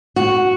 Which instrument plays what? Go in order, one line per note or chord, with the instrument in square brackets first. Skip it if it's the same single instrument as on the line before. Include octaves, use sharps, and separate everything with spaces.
[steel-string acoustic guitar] F#4